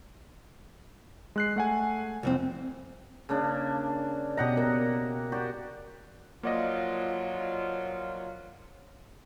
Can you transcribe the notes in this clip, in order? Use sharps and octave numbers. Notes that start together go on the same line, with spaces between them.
G#3 F#6 C7
A3 F#5 G#5
C2 F2 C4
C#3 A#3 D4
B2 G4 D#5 F#5 A#5
A#3 A#4
F#4 G4 D5
F3 F#3 A#3 F4 D5 D#5